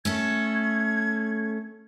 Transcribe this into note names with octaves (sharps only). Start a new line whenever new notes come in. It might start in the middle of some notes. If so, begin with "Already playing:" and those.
A3 C#4 A4 G#6